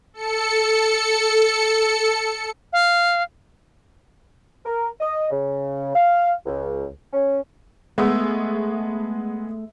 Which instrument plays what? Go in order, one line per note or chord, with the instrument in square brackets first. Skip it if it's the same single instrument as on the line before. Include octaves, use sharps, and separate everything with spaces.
[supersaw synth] A4 C#7
[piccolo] F5
[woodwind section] A#4
D#5
C#3
F5
C#2
C#4
[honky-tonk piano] G#3 B3 [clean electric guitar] A3